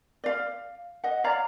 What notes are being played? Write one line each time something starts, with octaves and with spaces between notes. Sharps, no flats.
D5 F5
D#5 F#5
C#5 D5 F5 A#5